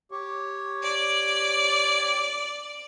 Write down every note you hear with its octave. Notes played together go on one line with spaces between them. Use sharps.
G4 C#5
D5